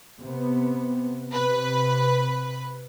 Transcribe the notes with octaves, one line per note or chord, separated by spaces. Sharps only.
C3 B3
C3 B4